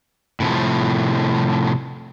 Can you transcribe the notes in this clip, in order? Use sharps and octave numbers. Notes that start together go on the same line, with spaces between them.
A2 C3 F3